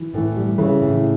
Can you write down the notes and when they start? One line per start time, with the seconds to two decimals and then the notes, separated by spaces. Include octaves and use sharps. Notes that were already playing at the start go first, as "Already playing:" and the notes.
Already playing: E3
0.14 A2 E3
0.36 G3
0.58 C#3 E3
0.81 A2